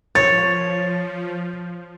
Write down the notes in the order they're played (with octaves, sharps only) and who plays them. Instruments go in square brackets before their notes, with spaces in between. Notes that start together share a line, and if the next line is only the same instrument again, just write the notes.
[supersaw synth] F3 [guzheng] C#5 [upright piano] A6